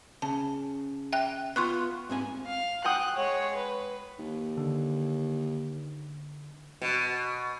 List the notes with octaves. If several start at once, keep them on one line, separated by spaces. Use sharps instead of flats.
C#3 A5
E5 G5 F#6
B3 F4 C6 C#6 F#6
G#2 C4 G#5
F5
F#5 G5 D#6 F#6
G#3 C#5
B4
D#2
D3
B2